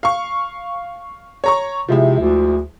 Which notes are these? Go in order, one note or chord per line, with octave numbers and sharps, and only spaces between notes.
F5 C#6
C#5 A#5 C#6
C3 F3 G#3 E4
D2